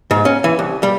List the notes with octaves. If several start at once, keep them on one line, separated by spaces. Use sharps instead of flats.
G#2
C#4
E3
C2
G3